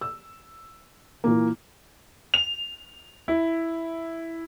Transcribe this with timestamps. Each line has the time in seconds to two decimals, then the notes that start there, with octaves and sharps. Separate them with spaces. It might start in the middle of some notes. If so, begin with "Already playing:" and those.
0.01 E6
1.24 A#2 E3 A#3
2.34 F7
3.28 E4